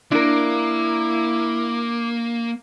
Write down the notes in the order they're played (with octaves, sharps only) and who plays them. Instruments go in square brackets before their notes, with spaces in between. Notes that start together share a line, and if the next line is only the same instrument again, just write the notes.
[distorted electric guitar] A#3 [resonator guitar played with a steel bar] D4 A#4 [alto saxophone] E4 [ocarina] D6